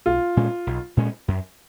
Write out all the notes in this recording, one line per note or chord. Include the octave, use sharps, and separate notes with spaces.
B1 F4
A#2 G#3 C#4
B1
A#2 G#3 C#4
F#2